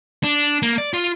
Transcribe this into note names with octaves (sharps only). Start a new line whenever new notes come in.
D4
A#3
D5
F4